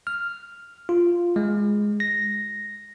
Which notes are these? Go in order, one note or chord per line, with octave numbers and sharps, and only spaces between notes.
F6
F4
G#3
A#6